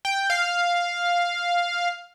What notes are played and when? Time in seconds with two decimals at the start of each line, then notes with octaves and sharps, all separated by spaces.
0.05 G5
0.30 F5